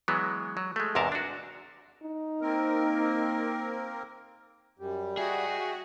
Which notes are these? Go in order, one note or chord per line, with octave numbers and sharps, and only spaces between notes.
E3 F#3 G#3 B3
F#3
G#3 A3
E2 G#2 C3 A#4 A5
D4 F#4
D#4
A#3 C4 A#4
F#2 G3
F#4 G#4 D#5 E5 G5